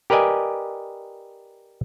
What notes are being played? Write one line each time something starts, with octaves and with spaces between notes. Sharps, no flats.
G4 A#4 B4 D5 D#5 G#5